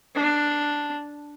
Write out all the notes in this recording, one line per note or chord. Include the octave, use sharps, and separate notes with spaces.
D4